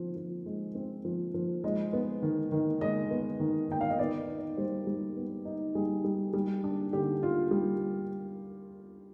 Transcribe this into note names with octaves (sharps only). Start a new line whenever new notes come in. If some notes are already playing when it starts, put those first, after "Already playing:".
Already playing: F3 C4
F3
G#3
C4
F3
F3
G#3 D#5
B3
D#3
D#3
G#3 D#5
B3
D#3
D#3 G5
F5
D#5
B3 D5
D#4
G3 C5
G3
B3
D#4
G3 G#4
G3
G3
D4
D3 G4
F4
G3